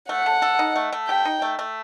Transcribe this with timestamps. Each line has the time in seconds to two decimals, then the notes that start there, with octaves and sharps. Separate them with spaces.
0.09 A3 F#5
0.26 A3
0.42 A4
0.59 D#4
0.76 A3
0.93 A3
1.08 G4 G5
1.25 D#4
1.42 A3
1.59 A3